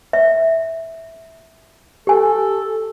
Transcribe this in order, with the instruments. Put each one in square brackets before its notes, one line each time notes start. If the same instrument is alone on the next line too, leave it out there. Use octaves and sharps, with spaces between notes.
[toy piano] E5
[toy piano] G4 G#5 [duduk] A4